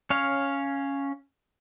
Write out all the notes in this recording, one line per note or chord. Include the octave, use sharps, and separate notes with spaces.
C#4 C#5 F5